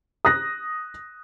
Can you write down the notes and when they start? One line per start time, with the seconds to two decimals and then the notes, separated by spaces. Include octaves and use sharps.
0.25 D#6 F#6 A#6